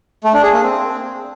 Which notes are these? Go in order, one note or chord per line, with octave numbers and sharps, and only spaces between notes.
A3
D4
G#4
A#3
C4